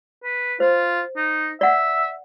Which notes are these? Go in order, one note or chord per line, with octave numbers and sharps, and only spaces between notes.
B4
F4 C5
D#4
D5 E5 F#5